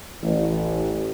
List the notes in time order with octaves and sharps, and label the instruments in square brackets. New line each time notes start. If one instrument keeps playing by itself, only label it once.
[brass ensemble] A1